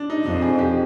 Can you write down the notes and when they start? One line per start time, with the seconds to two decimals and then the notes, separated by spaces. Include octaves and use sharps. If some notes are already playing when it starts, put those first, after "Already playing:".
Already playing: D4
0.10 D#4
0.25 F2 D#4
0.42 G#4
0.58 G4